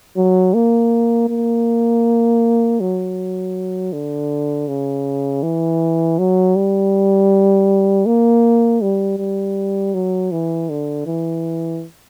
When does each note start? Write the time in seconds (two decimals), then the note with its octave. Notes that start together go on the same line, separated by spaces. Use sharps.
0.17 F#3
0.54 A#3
1.29 A#3
2.80 F#3
3.93 D3
4.68 C#3
5.43 E3
6.19 F#3
6.56 G3
8.06 A#3
8.81 G3
9.18 G3
9.94 F#3
10.32 E3
10.70 D3
11.06 E3